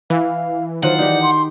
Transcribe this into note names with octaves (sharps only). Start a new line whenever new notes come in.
E3 F5
D#3 F#3 F4 C5 F#5
D#4 F#4 G4 D5
C6